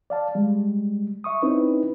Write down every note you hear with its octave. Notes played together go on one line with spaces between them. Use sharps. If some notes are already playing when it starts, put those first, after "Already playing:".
D5 F5 A5
G3 G#3
E5 C#6 D#6
C4 C#4 D#4 E4 B4